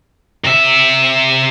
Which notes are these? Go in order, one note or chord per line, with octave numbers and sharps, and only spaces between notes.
C3 E5